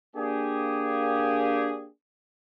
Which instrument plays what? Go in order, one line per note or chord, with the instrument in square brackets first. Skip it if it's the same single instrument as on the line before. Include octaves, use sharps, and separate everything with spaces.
[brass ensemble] A#3 D4 G4 G#4